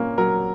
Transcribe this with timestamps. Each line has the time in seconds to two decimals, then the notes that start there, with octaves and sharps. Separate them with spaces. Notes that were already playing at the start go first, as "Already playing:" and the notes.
Already playing: A#2 A#3 C#4
0.18 F#3 A#4